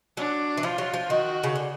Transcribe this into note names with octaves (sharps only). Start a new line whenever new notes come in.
F#3 D4
E3
F3 F4
F#3
F3
D#3 F#4
C#3
D3